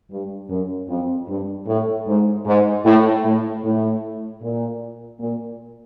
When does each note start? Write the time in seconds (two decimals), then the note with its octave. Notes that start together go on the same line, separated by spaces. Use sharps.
0.11 G2
0.49 F#2
0.89 F2
1.29 G2
1.67 A2
2.07 G#2
2.46 G#2
2.85 A2
3.25 A2
3.64 A2
4.42 A#2
5.20 A#2